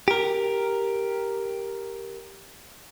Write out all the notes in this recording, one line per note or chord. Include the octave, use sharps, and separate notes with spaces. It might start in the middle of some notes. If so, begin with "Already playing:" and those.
G4 A#4